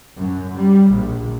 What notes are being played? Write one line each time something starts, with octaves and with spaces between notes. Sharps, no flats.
F#2
G3
A#1